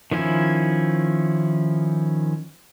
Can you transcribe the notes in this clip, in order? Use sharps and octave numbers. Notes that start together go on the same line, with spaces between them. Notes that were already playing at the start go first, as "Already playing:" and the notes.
D#3 F3 C#4 E4